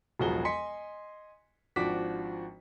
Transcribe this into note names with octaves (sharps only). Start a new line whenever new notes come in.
E1 B1 F3 F#4 G#4 G7
D#5 G#5 C6 B6 C#7
G#1 F3 D4 F#4 D6 B6